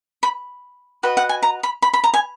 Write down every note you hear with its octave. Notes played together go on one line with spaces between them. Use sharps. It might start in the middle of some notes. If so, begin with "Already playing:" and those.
B5
F#4 B4 D#5
F#5
G#5
A#5
B5
B5
B5
A#5
G#5